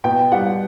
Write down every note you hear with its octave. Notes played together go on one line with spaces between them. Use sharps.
B2 G5
G3 F#5